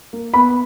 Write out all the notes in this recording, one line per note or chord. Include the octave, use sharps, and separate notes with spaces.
A#3
B3 B5